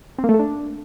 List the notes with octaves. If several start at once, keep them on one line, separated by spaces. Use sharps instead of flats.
C4
A#3
A3
A4
D4